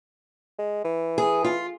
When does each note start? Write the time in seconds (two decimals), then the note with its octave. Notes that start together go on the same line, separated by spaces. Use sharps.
0.59 G#3
0.84 E3
1.18 G#4
1.44 F4